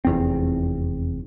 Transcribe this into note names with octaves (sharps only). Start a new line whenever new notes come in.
F1 E2 C4